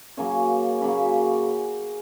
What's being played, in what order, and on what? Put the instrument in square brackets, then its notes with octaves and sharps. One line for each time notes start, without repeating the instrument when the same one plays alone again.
[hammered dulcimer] C#3 F#3 A#3 C#4 G#5
C#3 F#3 A#3 C#4 B5